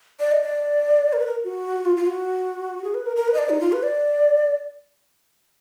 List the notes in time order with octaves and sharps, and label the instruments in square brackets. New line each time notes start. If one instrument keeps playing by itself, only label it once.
[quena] D5
D#5
D5
A#4
B4
A#4
F#4
F4
F4
F#4
G#4
B4
A#4
A#4
B4
D#5
D5
D#4
F4
B4
D5